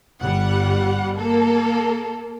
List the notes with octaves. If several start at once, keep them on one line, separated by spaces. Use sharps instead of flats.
G1 G3 F#5
A#3 A4